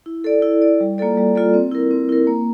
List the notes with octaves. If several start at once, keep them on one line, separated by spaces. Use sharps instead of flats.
E4
A4 D5
E4
A4 D5
G3
A#3 F4 A4 D5
G3
A#3 F4 A4 D5
C4
E4 A#4
C4
E4 A#4
A#3